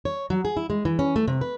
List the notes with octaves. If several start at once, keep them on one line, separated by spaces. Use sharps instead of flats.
C#5
F#3
G#4
E4
G#3
E3
C#4
A3
C3
B4